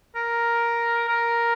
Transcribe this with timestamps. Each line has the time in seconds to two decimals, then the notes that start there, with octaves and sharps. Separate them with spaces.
0.16 A#4
1.09 A#4